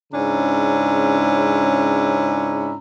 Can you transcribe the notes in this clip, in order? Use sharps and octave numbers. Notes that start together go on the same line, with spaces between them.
G#2 C#3 C#4 D4 E4 A#5